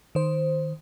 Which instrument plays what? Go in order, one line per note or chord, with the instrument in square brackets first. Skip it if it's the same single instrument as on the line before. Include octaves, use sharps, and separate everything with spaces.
[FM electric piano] D#3 C5